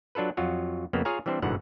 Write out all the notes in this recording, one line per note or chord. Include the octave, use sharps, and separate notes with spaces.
F#3 D4 F4 A4 B4
F2 F#3 F4 F#4
F2 C#3 A#3 B3
F4 G#4 C#5 F5 G#5 A#5
E3 G3 C4 D4 C5
G1 G#2 B2 D3 E3 F#5